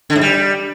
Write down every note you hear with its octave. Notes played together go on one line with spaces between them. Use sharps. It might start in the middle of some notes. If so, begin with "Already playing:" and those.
D3
G#2
G3